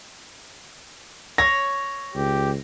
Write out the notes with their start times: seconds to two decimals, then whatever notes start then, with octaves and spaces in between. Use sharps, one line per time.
1.38 C#5 A#6
2.15 C#2 G4